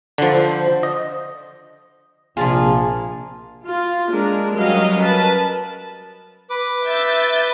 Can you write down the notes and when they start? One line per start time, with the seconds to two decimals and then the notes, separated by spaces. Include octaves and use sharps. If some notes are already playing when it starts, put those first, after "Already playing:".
0.18 D3 F3
0.32 C5
0.83 D#5
2.37 A#1 C3 F3 A#3 F4 G#4 A5
3.65 F4
4.09 G#3 A#3 D4 G#4 A#4
4.55 F#3 G3 C#4 A#4 D#5 F5
5.00 A#4 B4 A5
6.50 B4 D6
6.84 E5 G6 A6